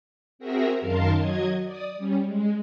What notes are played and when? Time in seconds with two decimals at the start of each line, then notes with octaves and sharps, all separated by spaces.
0.39 C4 F#4 G#4 A#4 E5 A#5
0.81 F#2 D#3 A#4 F5 A5 C6
1.13 F#3 D#5 G#6
1.64 D5 D#6
1.96 G3 C#4
2.25 G#3